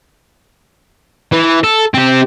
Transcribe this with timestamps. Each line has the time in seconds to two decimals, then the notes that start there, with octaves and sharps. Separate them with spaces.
1.32 E3
1.64 A4
1.94 C4 G4